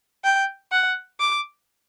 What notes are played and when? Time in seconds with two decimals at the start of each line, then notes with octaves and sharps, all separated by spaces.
0.24 G5
0.72 F#5
1.20 D6